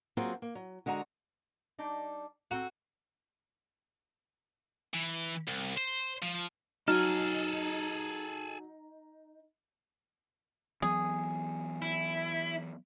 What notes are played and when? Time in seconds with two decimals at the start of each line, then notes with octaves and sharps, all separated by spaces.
0.17 F#3 A#3 C4 F4 F#4 G#4
0.42 A#3
0.55 F#3
0.86 D3 G#3 F#4 E5 A#5
1.79 G3 D4 D#4
2.51 C4 F#4 A4 A#5
4.94 E3
5.48 C2
5.78 C5
6.23 F3
6.88 F#3 D#4 G#4 A4 F6
10.82 E3 F#3 B3 G#4
11.82 E4